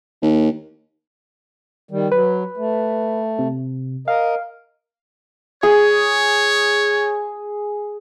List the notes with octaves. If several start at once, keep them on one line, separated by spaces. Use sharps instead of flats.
D#2
D#3 G3
F#3 B4
A3
C3
A#4 D#5 F5
G#4 C#5